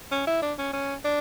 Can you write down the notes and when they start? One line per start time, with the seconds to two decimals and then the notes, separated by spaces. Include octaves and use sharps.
0.11 C#4
0.27 E4
0.42 D4
0.58 C#4
0.73 C#4
1.04 D4